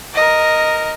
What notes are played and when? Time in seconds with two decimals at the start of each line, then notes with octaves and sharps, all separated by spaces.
0.14 A#4 D#5